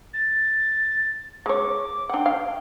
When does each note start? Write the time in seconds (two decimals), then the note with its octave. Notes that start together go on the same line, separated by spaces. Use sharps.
0.13 A6
1.46 G#3 C#5 D6
2.09 D4 F#5 G5
2.26 F5